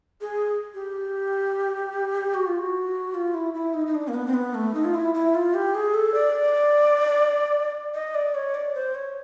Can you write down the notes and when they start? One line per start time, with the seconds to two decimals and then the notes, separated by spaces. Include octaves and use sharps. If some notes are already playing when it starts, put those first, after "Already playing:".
0.21 G#4
0.74 G4
2.34 F#4
2.47 F4
2.59 F#4
3.14 F4
3.34 E4
3.54 E4
3.74 D#4
3.87 D#4
3.95 D4
4.08 A#3
4.14 B3
4.27 C4
4.34 B3
4.54 A3
4.74 D#4
4.85 F4
4.94 E4
5.14 E4
5.35 F4
5.54 G4
5.74 G#4
5.94 A4
6.14 D5
7.94 D#5
8.15 D5
8.35 C#5
8.54 D5
8.75 C5
8.95 C#5